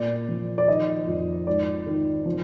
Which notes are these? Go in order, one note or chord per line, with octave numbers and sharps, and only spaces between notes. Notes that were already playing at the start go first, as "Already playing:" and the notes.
Already playing: A#2 D5
F3
D5
D#3 D#5
F2
G#2 D5
D#3
F3